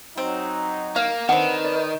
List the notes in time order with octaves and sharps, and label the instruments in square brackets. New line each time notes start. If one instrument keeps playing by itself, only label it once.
[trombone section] F#3 D#4 [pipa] C4
[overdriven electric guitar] A#3 [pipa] F5
[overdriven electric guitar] D#3 [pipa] C4 D4 [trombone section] B4 [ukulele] F#5
[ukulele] D5